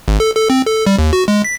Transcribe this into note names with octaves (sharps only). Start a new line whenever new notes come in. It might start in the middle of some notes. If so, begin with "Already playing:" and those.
G#1
A4
A4
C4
A4
G3
D#2
F#4
G#3
B6